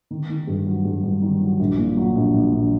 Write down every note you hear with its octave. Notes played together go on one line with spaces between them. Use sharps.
D#3
D#3
G2
F#3
G2
G2
D#3
F#3
A#1
A#2
F#3
A#1
A#1
A#1